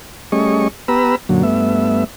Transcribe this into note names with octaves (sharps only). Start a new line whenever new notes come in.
G3 A3 C#4 G#4 D#5 C#6
B3 G4 B4 A#5 B5 E6
F#2 A#2 D3 F#3
G2 A3 B3 E5